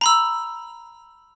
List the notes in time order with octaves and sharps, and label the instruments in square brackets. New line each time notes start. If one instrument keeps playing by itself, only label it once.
[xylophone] A#5 B5 E6